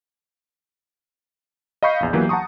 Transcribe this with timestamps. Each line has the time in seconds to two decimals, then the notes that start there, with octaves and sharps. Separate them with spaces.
1.83 D#5 F5 B5 C#6 G6 C7
2.00 A#1 E2
2.13 E3 F#3 A#3 B3 G4 B4
2.29 F#5 A5 A#5 C#6 D#6